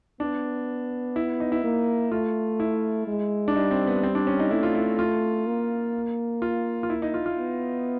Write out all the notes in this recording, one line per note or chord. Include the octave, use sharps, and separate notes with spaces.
B3 D4
E4
D#4
E4
A#3
A3 F4
E4
G#3
D4
G3 D#4
C4
B3
C4
D4
C#4
D#4
A3 E4
F4
E4
F4
A#3
F4
F4
E4
D#4
F4
F4
B3